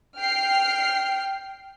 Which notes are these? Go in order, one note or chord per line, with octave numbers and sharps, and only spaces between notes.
G5 F6 C7